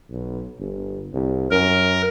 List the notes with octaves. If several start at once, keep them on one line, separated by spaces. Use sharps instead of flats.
B1
G1
C2
F#2 A#4